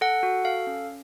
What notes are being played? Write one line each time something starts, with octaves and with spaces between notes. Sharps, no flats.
A4 F#5
F#4
A4 F5
C#4